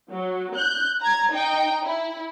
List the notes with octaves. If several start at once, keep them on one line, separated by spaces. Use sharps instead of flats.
F#3
F#6 G6
A#5 G#6
D#4 G5
E4